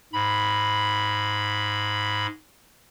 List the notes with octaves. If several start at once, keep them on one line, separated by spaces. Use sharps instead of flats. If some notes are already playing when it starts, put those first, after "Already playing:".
G#2 B5